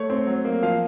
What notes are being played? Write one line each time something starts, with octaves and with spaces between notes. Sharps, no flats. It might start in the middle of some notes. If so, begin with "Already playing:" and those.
Already playing: A3 C#5
C4
F#3
A#3
F3 F5